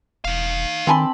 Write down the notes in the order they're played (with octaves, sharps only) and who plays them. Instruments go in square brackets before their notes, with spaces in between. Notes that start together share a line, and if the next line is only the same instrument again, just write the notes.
[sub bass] E1 [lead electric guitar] D#4 F5
[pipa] D3 G#5 C6 [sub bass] D#3 [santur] C4 A5 B5